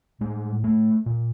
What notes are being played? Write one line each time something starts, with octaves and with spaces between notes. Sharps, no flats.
A2 G#3
A3
A#2